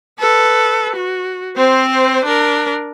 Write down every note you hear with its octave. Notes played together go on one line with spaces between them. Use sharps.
A4 B4
F#4
C4 C5
D4 A#4